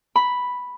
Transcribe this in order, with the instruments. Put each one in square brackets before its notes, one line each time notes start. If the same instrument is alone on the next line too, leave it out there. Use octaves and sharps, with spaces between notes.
[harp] B5